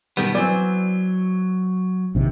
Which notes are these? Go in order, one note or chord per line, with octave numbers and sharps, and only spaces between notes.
B2 D#3 G3 B3
E3 F#3 B3 C4 D5
A#1 C3 D#3